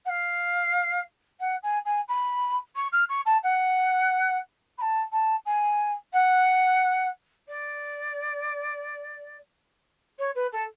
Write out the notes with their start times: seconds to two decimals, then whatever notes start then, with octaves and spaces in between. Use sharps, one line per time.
0.05 F#5
0.09 F5
1.40 F#5
1.63 G#5
1.85 G#5
2.08 B5
2.75 C#6
2.92 F6
3.09 C#6
3.25 A5
3.43 F#5
4.78 B5
4.81 A5
5.12 A5
5.45 G#5
6.13 F#5
7.48 D5
10.18 C#5
10.35 B4
10.52 A4